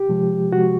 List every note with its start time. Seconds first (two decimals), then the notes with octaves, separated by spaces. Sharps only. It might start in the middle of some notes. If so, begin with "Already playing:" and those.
Already playing: G4
0.09 C3 F3 G#3
0.52 C3 F3 G#3 F#4